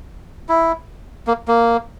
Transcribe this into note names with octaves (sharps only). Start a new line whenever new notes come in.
E4
A#3
A#3